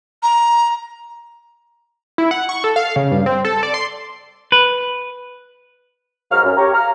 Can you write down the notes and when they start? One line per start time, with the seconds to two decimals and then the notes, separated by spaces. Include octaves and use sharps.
0.23 A#5
2.18 E4
2.31 F#5
2.49 C#6
2.64 A4
2.76 F5
2.96 C#3
3.11 G2
3.26 C4
3.45 A4
3.63 D5
3.74 C6
4.52 B4
6.31 G#2 F#3 A#3 A#5 F6
6.44 F#2
6.57 G4 C#5 A#5
6.73 F5 A#5 F6